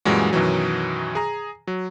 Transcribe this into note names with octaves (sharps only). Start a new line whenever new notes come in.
F#2 A#2 E3 G3 G#3 F#4
F#2 B2 D#3 E3 F#3
G#4 A#5
F#3